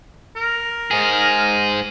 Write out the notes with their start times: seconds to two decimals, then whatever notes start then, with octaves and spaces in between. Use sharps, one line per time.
0.36 A#4
0.91 G#2 G#4